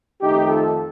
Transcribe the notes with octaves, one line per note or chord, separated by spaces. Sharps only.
F2 D#3 A3 D#4 G4
F4 A4